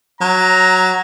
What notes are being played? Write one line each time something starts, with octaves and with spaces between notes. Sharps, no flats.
F#3 A#5